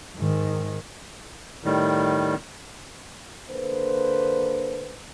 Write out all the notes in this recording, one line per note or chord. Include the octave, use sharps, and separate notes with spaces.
G#2 D#3
A2 D#3 G3
D3 A#3 B4 C5